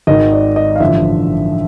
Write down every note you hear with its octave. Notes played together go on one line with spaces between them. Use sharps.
G#1 G#2 D#3 D#5
D5
D#5
F5
A1 G2 D3 F3 E5